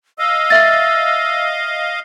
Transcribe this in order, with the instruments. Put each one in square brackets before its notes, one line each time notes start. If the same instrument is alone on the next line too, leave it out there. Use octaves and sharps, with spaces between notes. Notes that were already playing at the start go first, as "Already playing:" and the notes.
[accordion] D#5 F5 [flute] E6
[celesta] E5 A6